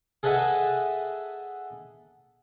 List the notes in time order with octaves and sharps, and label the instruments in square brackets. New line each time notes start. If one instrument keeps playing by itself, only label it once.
[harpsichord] G#4 A4 B4 D#5 E5 F#5